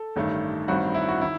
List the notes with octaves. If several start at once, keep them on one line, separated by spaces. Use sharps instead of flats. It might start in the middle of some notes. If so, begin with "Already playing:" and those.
Already playing: A4
A1 G2 D#3 A3
A1 G2 D#3 G3 C4 F#4
E4
F#4
D#3 E4